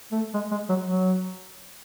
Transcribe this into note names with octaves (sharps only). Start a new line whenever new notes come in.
A3
G#3
G#3
F#3
F#3